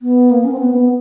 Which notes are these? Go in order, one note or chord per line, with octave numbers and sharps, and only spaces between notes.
B3
A#3
C#4
C4
B3
B3